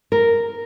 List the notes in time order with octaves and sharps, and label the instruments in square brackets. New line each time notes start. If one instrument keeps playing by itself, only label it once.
[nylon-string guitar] A#4